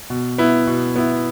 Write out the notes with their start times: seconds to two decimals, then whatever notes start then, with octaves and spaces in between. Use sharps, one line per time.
0.10 B2
0.38 B3 E4
0.67 B2
0.96 B3 E4